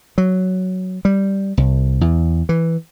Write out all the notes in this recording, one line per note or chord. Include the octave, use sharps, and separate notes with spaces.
F#3
G3
C2
E2
E3